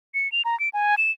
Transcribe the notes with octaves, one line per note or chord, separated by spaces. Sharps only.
C#7
F7
A#5
D7
G#5
E7